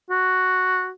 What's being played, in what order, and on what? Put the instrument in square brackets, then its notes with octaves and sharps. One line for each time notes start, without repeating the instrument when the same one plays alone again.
[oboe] F#4